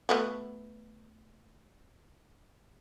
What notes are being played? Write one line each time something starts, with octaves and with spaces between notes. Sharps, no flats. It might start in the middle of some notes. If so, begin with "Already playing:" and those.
A3 B3 F#4